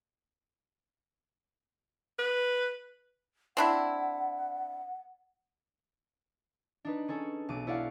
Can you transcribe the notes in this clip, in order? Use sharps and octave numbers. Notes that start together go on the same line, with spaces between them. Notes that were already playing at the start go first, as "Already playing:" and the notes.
B4
C4 D4 E4 F#5
D4 D#4 B4
C#4 G#4 A4 C#5
B1 D6 D7 D#7
E4 C#5 D5 F5 F#5